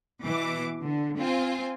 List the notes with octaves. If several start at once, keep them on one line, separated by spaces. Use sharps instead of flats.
B2 E3 D6
D3
C4 F4 G#5